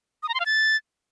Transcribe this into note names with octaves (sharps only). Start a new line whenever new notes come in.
D#6
A#5
C6
F5
A6